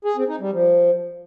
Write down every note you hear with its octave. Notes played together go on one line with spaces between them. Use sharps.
G#4
C4
D#4
G3
F3